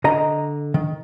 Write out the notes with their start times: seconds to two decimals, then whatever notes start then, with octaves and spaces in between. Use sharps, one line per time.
0.04 D3 D#5 A#5
0.74 D#3